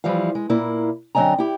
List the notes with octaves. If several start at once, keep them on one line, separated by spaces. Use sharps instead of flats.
E3 F3 G3 E4 F5
G#3
A#2 A#3 E4
D3 F#3 C4 D#5 G#5 A#5
E4 G4